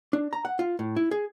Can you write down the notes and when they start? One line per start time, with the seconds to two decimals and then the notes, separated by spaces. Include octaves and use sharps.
0.13 D4
0.33 A#5
0.45 F#5
0.59 F4
0.79 A2
0.96 E4
1.11 G#4